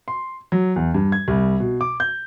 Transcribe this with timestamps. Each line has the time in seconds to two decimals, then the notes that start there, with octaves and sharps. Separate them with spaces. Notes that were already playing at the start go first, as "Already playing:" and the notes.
0.08 C6
0.52 F#3
0.76 E2
0.94 G2
1.12 G#6
1.28 C2
1.60 B2
1.81 D6
2.00 G6